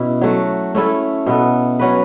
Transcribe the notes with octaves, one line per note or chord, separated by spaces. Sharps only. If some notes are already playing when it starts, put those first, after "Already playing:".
Already playing: B2 C#4 E4
F#3 A3 F#4
A3 C#4 E4 A4
B2 B3 A4
F#3 C#4 F#4 B4